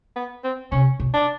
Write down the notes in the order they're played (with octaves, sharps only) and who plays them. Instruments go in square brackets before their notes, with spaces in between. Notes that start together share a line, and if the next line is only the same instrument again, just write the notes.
[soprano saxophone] B3
C4
[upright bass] C3 [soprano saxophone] C#4
[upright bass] B2
[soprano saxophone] D4